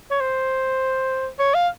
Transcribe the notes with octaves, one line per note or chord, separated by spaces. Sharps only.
C#5
C5
C#5
F5